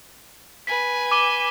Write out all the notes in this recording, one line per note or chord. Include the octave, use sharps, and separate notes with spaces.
B4 G#5 B6
D6 D#7 G7